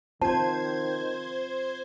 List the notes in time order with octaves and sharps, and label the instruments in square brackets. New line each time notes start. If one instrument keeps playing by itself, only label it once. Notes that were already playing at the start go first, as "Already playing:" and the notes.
[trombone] D#3 [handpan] C4 F4 [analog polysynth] C5 G#6 [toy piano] A5